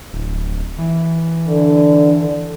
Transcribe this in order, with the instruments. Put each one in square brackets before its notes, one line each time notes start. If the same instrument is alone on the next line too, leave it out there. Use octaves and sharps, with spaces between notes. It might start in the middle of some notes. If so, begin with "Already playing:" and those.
[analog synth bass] D1
E3
[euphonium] D3